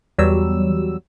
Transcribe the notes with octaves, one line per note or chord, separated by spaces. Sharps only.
E2 F#3 G3 E6